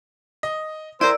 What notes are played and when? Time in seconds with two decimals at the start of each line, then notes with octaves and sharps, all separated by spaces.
0.43 D#5
1.01 E4 A#4 C5 D5 E6